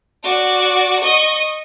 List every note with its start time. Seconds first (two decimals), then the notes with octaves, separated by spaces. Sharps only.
0.24 F#4 D5
0.99 D#5 C#6